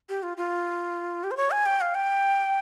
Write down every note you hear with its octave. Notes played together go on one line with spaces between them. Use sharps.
G4
F4
F4
G4
C5
C#5
G#5
G5
F5
G5